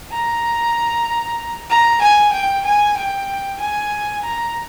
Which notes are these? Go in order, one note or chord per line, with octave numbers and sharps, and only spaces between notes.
A#5
A#5
G#5
G5
G#5
G5
G#5
A#5